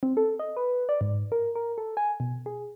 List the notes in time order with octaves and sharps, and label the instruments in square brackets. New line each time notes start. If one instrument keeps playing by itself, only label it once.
[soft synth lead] C4
A4
D#5
B4
D5
G#2
A#4
A#4
A4
G#5
B2
G#4